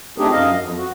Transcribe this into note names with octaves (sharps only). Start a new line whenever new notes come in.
A3 C4 D4 D#4 G4 G#4
F#2 D#5 F5
F2
F#4